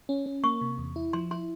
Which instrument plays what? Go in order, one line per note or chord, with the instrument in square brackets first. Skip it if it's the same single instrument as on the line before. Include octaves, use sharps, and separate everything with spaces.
[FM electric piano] C#4
C#4
[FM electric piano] A#3 [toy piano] C#6
[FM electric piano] C3
E2
E4
[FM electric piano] F3 [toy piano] C6
[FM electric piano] E4 [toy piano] C6